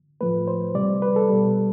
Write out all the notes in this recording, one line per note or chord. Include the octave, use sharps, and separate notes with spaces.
A2 F3 A3 B4
C5
C3 G3 D5
B4
A4
B2 G3